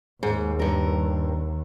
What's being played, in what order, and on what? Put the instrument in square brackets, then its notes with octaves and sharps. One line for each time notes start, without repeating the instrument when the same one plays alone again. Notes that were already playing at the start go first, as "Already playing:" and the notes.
[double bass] D#2 [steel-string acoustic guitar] G#2
[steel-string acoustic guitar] G2 A#4